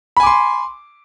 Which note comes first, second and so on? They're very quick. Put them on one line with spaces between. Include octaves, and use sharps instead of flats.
B5 G#5 D6 C6